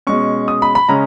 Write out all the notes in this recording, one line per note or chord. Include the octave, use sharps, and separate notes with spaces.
B2 G#3 C#4 C#6
D#6
B5
B5
C#3 G#3 C#4 A#5